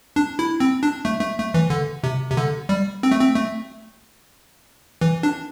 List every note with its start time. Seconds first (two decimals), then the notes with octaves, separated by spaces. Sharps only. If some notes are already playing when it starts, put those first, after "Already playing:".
0.16 D4
0.39 E4
0.60 C4
0.83 D4
1.05 A3
1.21 A3
1.38 A3
1.54 E3
1.70 D3
2.04 C3
2.30 C3
2.37 D3
2.69 G3
3.03 C4
3.12 A3
3.20 C4
3.36 A3
5.01 E3
5.23 D4